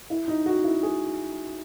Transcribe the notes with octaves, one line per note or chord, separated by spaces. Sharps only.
E4
D#4
F#4
E4
G#4